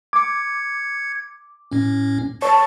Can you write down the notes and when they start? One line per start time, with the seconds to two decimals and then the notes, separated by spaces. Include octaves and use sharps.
0.13 D6 G#6 C#7
1.72 A2 C#4
2.42 C#5 A5 C#6